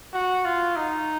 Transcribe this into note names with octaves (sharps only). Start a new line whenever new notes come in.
F#4
F4
D#4